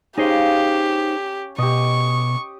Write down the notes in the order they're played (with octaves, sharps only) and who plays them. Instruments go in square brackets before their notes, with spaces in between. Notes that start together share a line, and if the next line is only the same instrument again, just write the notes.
[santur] C#4 F5 [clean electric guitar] D#4 G#4 C5 [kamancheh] G4
[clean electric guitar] B2 [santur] G4 D#5 [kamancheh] C#6